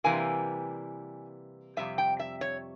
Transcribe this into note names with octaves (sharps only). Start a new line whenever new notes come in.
C3 E3 G3 A#3 G#5
F2 C3 G3 E5
G5
E5
C#5